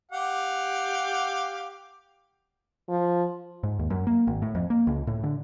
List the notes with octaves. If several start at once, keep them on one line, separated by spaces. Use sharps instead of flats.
G4 F5 F#5
F3
G#2
D#2
F#2
A#3
G#1
A2
F2
A#3
C#2
A2
D3